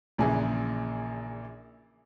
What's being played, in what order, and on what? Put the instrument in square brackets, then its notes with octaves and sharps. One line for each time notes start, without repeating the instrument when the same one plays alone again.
[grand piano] A#1 A#2 C#3 E3 G#4